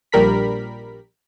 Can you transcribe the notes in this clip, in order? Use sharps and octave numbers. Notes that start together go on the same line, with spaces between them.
A#1 G3 A#4 B5 B6